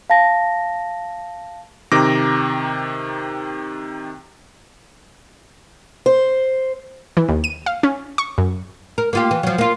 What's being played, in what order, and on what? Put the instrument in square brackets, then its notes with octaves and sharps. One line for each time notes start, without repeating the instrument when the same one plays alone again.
[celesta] F5 A5 A#6
[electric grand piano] C3 D#3 A#5 D6 A#6
[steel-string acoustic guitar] C5
[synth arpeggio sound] E3
D#2
D#7
F5
C#4
C#6
F#2
[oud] A#4
A#3 F4 G4
E3
F3 F#3
A#3 F4